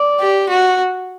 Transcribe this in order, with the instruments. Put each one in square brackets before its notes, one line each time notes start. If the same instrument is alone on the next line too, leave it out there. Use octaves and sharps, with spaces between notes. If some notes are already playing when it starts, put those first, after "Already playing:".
Already playing: [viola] D5
[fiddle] G4
F#4